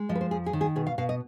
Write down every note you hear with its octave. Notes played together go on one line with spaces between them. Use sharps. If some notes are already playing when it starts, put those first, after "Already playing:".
Already playing: G#3
F3 D#5
B4
C5
F2 G#4
G#4
D#3
G#4
B2 G#4
F5
B2 F5
D#5